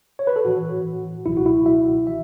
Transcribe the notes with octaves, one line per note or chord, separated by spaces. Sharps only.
C#5
B4
A4
A2 E3 F#4
C#2 B2 F#3 E4
F#4
E4
E5
E3 E5